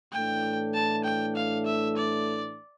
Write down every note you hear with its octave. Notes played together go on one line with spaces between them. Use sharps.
A2 E3 A3 D4 G5
A5
G5
F5
E5
D5